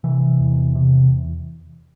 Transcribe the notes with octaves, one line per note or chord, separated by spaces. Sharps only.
C3 E3
E2
C3